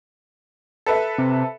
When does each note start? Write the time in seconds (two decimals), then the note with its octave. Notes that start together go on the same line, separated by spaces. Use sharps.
0.86 A4 B4 E5
1.18 C3